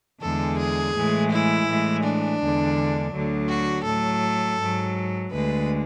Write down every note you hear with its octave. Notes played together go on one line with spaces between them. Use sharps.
E2 D3 G#3 A4
G#4
A2 E3 G#3
E4
A2 E3 G#3
D4
E2 D3 G#3
D2 D3 F#3
F#4
A2 F#3 A4
G#2 F#3
D2 D3 G#3 B4